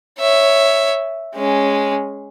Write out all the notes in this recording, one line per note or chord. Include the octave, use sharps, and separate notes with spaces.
C#5 E5
G#3 C#4